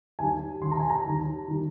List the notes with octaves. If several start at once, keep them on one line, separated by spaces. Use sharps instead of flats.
D#2 D#3 G3 G#5
D#2 D#3 G3 C6
A#5
G#5
A#5
D#2 D#3 G3
D#3 G3